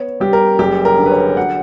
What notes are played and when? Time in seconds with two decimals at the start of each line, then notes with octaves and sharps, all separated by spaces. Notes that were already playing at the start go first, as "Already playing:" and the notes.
Already playing: B3 C#5
0.20 G3 G4
0.33 A#4
0.59 F#1 G4
0.85 A#4
0.98 D3
1.06 B4
1.11 C#5
1.37 F#3 F#5